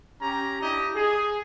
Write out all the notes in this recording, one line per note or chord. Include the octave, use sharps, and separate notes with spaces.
C#4 G4 A#5
D4 E4 G4 D#5
G#4